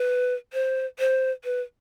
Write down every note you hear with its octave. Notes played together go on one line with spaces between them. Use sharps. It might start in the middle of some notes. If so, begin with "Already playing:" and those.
Already playing: B4
C5
C5
B4